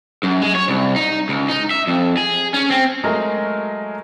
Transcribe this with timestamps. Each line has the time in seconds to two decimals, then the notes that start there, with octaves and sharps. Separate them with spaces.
0.23 F#2
0.41 G#3
0.55 C#5
0.68 C2
0.96 D#4
1.29 C#2
1.49 D#4
1.71 E5
1.87 F2
2.17 G#4
2.54 C#4
2.71 C4
3.04 F#3 G#3 A3 A#4